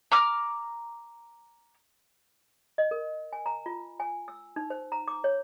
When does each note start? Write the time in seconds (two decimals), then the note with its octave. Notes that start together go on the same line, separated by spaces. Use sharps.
0.12 A#5 D6 F6
2.78 D#5
2.91 A#4
3.33 G#5
3.46 A#5
3.66 F4
4.00 G#5
4.28 E6
4.56 D#4
4.70 C5
4.92 A#5
5.08 D6
5.24 C#5